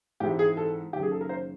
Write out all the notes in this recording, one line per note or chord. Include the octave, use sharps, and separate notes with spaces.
G#2 E3 G#3 C4 E4 G4
G#4
A4
F#1 F#2 D#3 G4
G#4
A4
A#4
C5